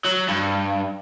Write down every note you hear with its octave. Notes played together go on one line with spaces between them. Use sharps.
F#3
G2